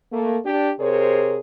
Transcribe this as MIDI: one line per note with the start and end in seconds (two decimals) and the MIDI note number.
0.11 0.37 57
0.11 0.37 58
0.44 0.70 62
0.44 0.70 67
0.79 1.37 48
0.79 1.37 68
0.79 1.37 70
0.79 1.37 72
0.79 1.37 73